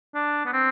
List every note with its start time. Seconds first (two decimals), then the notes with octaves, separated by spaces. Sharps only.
0.15 D4
0.46 B3
0.53 C4